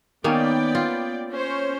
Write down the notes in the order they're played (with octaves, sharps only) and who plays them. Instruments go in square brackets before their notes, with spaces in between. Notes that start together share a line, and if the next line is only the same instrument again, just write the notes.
[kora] D#3 A#3 C#4 [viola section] B3 D5 G5
[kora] F4
[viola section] C#4 C5 C#5